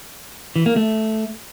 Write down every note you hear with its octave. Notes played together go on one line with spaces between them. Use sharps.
E3
A#3
A3